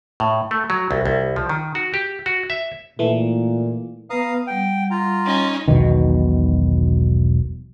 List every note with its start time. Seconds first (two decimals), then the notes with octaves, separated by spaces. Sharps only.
0.20 A2
0.51 A3
0.70 F#3
0.91 C2
1.05 C2
1.36 F3
1.49 D#3
1.75 F#4
1.94 G4
2.26 F#4
2.50 E5
2.99 A#2 E3 A3
4.10 B3 B4 F5 A#5 D#6
4.47 G3 F#5 G5
4.91 F4 A#5
5.25 C#4 D#4
5.68 E1 B1 B2 D#3